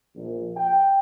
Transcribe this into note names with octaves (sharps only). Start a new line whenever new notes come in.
A#1
G5